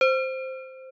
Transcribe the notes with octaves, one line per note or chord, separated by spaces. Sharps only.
C5